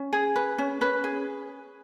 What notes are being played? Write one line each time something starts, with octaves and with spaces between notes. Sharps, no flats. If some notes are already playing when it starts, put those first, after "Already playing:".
Already playing: C#4
G#4
B4
C#4
C#4 B4
G#4